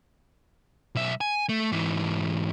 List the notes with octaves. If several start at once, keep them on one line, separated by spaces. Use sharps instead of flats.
B1 E5
G#5
A3
G#2 E3